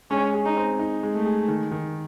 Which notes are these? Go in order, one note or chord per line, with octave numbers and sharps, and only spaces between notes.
G#3 C#4
G#4
D#4
C4
D#4
G#3
A3
G#4
D#3
D#3